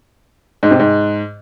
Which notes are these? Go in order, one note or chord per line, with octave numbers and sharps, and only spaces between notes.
G#2
C3
G#2